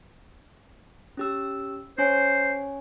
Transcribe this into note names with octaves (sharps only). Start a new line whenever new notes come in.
C#4 G4 E6
C#4 C5 C#5 G#5